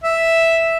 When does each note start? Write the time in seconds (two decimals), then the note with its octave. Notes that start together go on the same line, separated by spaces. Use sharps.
0.04 E5